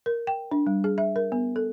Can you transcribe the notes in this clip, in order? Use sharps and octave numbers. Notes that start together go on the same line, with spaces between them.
A#4
G5
D4
G3
G#4
E5
A#4
B3
A4